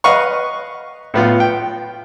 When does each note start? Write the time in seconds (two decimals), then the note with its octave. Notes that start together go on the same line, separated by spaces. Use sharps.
0.04 B4 D#5 F5 F#5 C#6
1.14 A2 B3 F4
1.40 G5